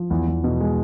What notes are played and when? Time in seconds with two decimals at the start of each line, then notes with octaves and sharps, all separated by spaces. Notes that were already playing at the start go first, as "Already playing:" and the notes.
Already playing: F3
0.10 E2
0.27 E2
0.44 B2
0.60 G#3